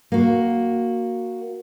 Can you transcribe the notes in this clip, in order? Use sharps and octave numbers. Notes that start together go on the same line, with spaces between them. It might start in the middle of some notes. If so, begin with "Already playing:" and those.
A#3 F#4